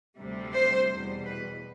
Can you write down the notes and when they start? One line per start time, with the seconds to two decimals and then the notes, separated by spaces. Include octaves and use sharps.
0.17 D2 C3 G3
0.53 C5
0.88 E2 B2 G3
1.24 B4